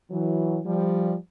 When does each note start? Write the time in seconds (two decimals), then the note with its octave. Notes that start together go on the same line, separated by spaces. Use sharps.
0.10 E3 F#3
0.65 F3 G3